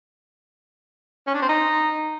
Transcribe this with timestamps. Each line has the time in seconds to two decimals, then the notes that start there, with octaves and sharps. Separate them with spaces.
1.27 C#4
1.34 D4
1.42 C4
1.49 D#4